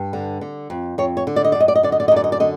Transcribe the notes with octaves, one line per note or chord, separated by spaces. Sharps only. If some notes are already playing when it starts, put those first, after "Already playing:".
Already playing: G2
D3
D3
F2
F2 C#5
C#5
D3
D5
D#5
F#2 D5
D#5
D5
D#5
D3 D5
D#5
D5
D#5
F#2 D5
D#5
D5
D3 D#5